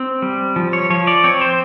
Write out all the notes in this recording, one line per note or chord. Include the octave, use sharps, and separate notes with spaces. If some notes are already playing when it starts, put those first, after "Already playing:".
Already playing: C4
G3
F3
C#5
F3 C#5
D5
C4 C#5
C5